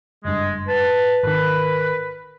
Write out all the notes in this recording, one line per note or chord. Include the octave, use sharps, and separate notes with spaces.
F#1 G2 G#3
B4 A5
G#1 D#3 A#4 B4